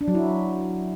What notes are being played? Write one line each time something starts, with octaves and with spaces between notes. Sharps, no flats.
D4
F#3
E4